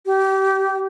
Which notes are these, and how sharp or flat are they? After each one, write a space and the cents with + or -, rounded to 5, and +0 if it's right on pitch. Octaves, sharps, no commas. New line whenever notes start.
G4 -25